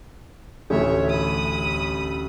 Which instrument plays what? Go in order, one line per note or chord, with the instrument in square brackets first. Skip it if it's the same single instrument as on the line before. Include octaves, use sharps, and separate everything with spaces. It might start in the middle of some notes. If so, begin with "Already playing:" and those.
[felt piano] A1 D2 [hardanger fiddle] C#5 E5
[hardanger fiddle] B5 D#6